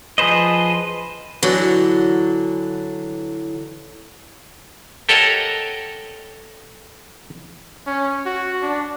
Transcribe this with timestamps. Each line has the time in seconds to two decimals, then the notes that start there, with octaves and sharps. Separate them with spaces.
0.18 F3 G#4 B4 C5 D#5
1.43 D3 E3 F#3
5.09 G4 A4 A#4 C#5 D#5 F#5
7.87 C#4
8.26 F#4
8.62 D4